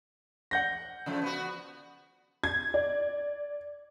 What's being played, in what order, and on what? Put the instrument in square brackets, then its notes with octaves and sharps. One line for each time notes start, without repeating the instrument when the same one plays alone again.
[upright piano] F#5 G6 A#6
[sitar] C#3 F3 A3
B3 F#4
[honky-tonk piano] G#6
D5